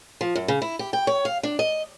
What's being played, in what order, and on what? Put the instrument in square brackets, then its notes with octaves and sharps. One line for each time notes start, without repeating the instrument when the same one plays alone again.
[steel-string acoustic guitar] F3
F#2
C#3
E4
G4
G5
C#5
F5
D4
D#5